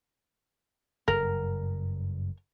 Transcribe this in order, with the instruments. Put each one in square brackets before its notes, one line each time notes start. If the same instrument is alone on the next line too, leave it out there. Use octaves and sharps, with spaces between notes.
[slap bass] F#1 G2 [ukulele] A#4